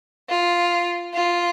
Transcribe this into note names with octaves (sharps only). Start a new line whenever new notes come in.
F4
F4